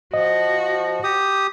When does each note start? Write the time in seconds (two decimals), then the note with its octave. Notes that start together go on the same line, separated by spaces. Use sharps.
0.14 F3 F#4 D#5
1.04 G4 D#6